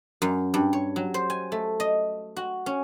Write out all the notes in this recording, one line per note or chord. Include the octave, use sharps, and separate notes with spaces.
F#2
G2
C#5
F#3
C5
G#5
A3
D#5
F#4
C#4